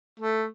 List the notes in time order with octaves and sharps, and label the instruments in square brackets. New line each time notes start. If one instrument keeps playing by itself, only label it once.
[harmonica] A3